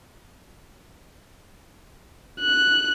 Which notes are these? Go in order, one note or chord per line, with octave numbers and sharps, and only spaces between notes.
F#6